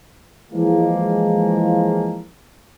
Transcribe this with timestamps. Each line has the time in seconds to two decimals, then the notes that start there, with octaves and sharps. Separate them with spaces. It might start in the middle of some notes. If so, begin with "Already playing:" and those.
0.51 E3 F3 G#3 A#3